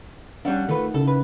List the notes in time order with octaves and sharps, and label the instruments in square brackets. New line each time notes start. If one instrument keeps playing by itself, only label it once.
[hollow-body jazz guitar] G3 C#4 D4 [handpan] F5 F#5
[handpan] D#3 [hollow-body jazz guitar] A3 F4 B4
[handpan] C#3 E4 [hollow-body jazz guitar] A4
[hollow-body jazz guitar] B4